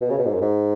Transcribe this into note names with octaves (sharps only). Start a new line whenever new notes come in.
B2
C#3
B2
G#2
F#2
G#2